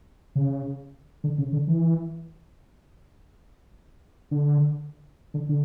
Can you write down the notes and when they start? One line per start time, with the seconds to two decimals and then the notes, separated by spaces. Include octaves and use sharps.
0.35 C#3
1.24 D3
1.38 C#3
1.53 D3
1.68 E3
4.31 D3
5.34 D3
5.49 D3